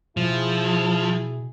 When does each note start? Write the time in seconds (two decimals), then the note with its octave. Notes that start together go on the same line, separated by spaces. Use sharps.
0.17 B2 F3 E4 G#4